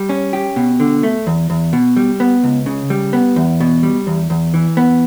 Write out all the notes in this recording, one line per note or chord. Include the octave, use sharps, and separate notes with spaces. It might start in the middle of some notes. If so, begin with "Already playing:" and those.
Already playing: G3
C#4
G4
B2
D3
A3
E2
E2
B2
G3
B3
C#2
C#3
G3
B3
E2
B2
G3
E2
E2
E3
B3